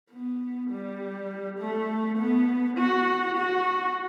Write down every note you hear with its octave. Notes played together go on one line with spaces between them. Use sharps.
B3
G3
A3
B3
F#4
F#4